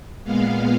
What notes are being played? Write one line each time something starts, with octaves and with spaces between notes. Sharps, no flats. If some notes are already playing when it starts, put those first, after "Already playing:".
A#2 G#3 B3 F5